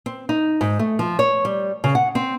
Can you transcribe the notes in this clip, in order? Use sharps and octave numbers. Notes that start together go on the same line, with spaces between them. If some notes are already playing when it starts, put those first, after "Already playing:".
C4
D#4
G#2
A3
F3
C#5
G3
C#3
F#5
C4